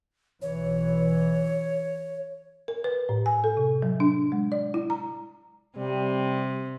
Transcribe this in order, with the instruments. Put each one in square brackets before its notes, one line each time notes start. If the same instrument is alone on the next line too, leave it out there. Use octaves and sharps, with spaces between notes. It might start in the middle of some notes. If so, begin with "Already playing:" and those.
[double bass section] B1 E3 [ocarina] C#5
[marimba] A#4
B4
A2
G#5
A4
C3
F#3
D4
G#3
D5
E4
A#5
[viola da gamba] C3 [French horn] G3